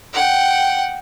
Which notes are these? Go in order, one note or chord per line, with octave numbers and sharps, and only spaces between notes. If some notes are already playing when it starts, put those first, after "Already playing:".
F#5 G5